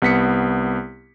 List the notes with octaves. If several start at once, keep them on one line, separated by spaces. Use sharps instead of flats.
C2 B3 B6 C#7